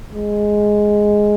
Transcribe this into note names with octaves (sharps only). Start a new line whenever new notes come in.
G#3